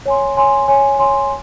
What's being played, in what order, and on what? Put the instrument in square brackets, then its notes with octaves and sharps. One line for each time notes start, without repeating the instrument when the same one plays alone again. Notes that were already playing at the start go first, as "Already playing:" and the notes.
[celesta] C#5 G#5 C6
C#5 G#5 C6
C#5 G#5 C6
C#5 G#5 C6